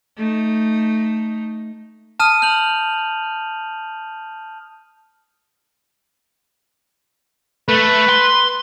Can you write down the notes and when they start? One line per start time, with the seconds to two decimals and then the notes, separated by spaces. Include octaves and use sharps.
0.17 A3 D#4
2.20 A5 D#6 F6 D#7
2.42 F6 G6 F7 F#7
7.69 A3 B4
8.09 C6